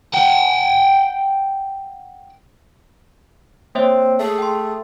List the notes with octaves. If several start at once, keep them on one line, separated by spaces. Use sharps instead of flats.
F#5 G5
A#3 C4 C#5 E5
A3 G#4
G5 C6